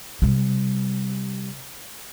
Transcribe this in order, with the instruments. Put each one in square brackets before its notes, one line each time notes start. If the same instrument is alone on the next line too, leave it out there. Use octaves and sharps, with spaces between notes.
[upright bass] C3 G3